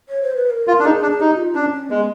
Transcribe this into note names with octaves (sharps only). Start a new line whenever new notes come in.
C#5
C5
B4
A#4
F4
D4
D#4 G#4
D4
D#4 G4
F4
C#4 D4
C#4
G#3 B3